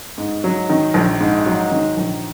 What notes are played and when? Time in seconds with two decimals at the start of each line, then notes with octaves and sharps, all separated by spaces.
0.18 G#2
0.44 F#3
0.69 D#3
0.94 A#1
1.20 G#2
1.46 F#3
1.71 D#3
1.97 A#1